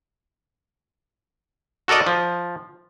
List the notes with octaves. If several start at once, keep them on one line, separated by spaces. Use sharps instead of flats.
F#4 A4 A#4 D5 D#5
F3